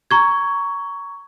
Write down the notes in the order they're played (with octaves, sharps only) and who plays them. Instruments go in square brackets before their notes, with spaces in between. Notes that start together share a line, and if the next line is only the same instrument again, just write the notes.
[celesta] A#5 C#6 G#6